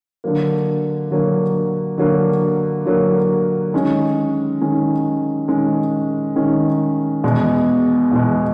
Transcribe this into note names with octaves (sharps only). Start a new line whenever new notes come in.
D3 F#3 A#3
D3 F#3 A#3
D3 F#3 A#3
D3 F#3 A#3
D#3 G#3 C#4
D#3 G#3 C#4
D#3 G#3 C#4
D#3 G#3 C#4
E2 B2 G#3
E2 B2 G#3